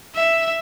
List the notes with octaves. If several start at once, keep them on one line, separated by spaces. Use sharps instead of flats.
E5